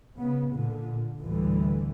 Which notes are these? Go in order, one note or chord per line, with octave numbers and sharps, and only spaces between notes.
C#3 B3
A#2 D3
A1 D2 D3 E3 G3